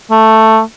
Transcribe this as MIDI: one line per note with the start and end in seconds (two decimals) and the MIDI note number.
0.11 0.61 57